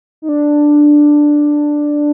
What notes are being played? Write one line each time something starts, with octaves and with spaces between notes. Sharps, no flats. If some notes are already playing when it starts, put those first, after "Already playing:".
D#4
D4